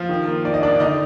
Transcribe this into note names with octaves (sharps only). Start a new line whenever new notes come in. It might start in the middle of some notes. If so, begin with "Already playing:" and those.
Already playing: F3 F4
D#3
A#3
D#3 D5
D#5
A#3 D4 D5
D3 D#4 D#5